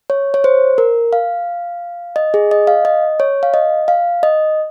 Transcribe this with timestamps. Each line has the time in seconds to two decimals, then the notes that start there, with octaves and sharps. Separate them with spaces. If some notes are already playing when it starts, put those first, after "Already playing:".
0.10 C#5
0.34 C#5
0.44 C5
0.78 A#4
1.13 F5
2.16 D#5
2.34 G#4
2.51 D#5
2.67 F5
2.85 D#5
3.20 C#5
3.43 F5
3.54 D#5
3.88 F5
4.23 D#5